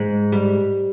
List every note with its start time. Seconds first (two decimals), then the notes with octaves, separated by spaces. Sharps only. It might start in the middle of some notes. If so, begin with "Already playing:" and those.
Already playing: G#2
0.32 G3